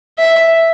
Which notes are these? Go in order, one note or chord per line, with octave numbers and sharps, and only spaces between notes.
E5